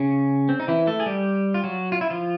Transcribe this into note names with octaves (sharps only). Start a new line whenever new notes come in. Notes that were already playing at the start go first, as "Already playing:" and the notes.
Already playing: C#3 C#4
C4
D#4
E3 E4
A3 A4
G#4
G3 G4
F4
F#3 F#4
F4
E4
F3 F4